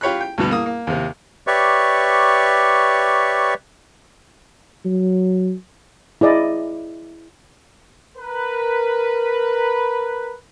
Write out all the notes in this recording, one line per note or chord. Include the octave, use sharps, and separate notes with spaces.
F4 G4 C#5 B5 F#6
G5
D2 G2 B2 B3
A#3 D#6
A#3
D#2 C3
G4 B4 C#5 D5 E5 C#6
F#3
E4 G#4 D5 D#5
A#4 B4